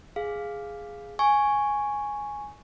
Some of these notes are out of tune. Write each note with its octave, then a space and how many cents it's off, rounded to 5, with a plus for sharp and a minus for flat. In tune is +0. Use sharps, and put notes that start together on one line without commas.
G#4 +0 F5 +0
G#5 +0 C#6 +0